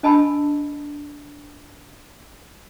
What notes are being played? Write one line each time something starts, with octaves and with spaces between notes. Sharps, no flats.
D4 D#5 G#5 A5 B5 E6